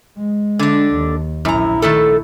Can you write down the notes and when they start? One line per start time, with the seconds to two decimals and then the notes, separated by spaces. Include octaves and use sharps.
0.18 G#3
0.59 D3 D4
0.93 D#2
1.45 A#1 F#2 E4 A#5
1.82 D#3 A3 A4